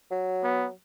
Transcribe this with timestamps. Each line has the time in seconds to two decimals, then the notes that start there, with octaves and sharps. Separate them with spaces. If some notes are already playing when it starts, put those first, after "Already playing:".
0.11 F#3
0.43 B3